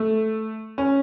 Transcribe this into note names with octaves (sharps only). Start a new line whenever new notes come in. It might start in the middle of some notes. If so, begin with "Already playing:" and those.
Already playing: A3
C#4